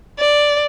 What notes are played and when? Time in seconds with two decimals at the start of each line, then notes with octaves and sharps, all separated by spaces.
0.19 D5